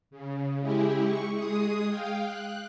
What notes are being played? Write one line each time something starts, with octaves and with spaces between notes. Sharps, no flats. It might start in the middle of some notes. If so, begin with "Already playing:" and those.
C#3
G#3 E4 G4 G#4
C#6
G#3 G#4 D#6
F5 G5
F#6